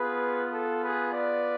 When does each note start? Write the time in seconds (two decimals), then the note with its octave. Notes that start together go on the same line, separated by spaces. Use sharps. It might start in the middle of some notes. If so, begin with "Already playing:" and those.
Already playing: B3 F4 G#4 B4
0.52 A4
0.82 G#4 B4
1.13 B4 D5